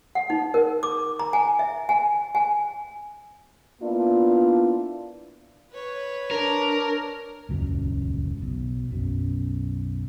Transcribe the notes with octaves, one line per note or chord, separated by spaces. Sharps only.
F#5
D#4
A#4
D6
A#5
G#5
E5
G#5
G#5
A#3 B3 D4 E4 F4
B4 C#5
D4 A#4
D#1 C#2 F#2
B1
B1 F#2